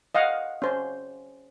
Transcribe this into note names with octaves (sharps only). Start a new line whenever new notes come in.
D#5 F5 F#5
C#4 C5